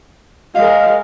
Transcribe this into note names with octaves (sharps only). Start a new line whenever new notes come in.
G#3 A#4 D#5 F5